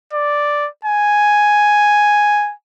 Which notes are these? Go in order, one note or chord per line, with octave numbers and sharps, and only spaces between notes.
D5
G#5